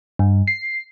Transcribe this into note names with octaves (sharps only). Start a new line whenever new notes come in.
G2
C7